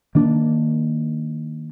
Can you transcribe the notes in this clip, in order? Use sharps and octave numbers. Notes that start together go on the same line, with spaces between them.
D#3 A#3 D4